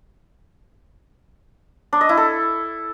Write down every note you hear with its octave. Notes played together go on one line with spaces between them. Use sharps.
D4
D#5
E4
A4